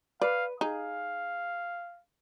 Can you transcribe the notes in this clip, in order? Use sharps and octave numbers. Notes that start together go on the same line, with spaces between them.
B4 D5 F5
D#4 G#4 F5